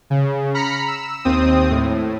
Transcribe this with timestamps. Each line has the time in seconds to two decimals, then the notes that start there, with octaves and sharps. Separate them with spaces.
0.10 C#3
0.54 A#5 B5 F6 B6 C#7
0.88 E6
1.25 D#2 C4 D#6
1.70 A2